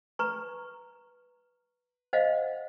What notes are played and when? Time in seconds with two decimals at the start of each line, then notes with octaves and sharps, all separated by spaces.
0.19 B4 A#5 C#6
2.13 C5 D#5 F5 F#5